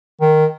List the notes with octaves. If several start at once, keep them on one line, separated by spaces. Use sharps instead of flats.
D#3